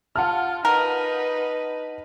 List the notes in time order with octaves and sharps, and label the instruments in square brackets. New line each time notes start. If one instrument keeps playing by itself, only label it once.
[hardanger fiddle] F4 [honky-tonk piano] F#5 A5 F6
[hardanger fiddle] D#4 B4 [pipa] A#4